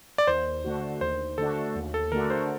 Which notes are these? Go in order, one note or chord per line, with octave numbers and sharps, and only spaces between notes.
D5
D#2 C5
D3 A3 D4 F#4
D#2 C5
D3 A3 D4 F#4 A4
D#2
A4
D3 A3 D4 F#4 A#4
C5